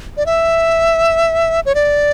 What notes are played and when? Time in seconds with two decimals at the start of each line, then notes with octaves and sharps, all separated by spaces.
0.17 D5
0.26 E5
1.66 C#5
1.75 D5